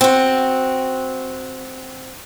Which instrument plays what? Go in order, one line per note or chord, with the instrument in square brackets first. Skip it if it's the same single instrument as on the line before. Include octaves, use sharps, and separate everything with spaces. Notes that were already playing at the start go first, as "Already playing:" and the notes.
[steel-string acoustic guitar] C4 F#4